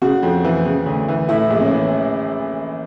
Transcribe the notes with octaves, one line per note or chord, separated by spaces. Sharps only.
C#3 F#4
F2
E3
C#3
D2
E3
A2 E4
A#1
C#4
E3